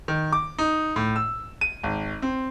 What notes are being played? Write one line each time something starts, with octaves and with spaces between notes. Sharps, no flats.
D#3
D6
D#4
A2
E6
D#7
G#1
C4